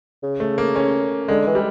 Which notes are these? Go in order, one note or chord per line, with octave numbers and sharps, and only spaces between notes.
C#3
A3
A#3
C#4
D3 G#3
E3
G3